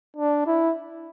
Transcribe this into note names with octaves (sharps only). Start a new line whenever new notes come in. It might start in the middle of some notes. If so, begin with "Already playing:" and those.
D4
E4